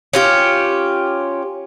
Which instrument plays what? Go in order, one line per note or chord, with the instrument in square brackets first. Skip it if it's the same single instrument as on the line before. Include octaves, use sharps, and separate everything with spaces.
[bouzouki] C#4 F4 G4